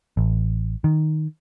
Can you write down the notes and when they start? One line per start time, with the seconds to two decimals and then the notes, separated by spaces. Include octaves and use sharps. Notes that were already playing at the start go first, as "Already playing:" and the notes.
0.17 A1
0.84 D#3